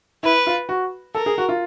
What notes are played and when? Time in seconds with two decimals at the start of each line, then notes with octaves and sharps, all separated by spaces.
0.23 E4 B4
0.47 F4
0.69 F#4
1.15 A4 A#4
1.26 G#4
1.38 F#4
1.49 F4